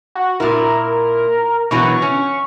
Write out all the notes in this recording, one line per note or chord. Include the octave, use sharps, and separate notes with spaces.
F#4
A#2 E4 A#4
B2 E3 F#3 C#6
C#4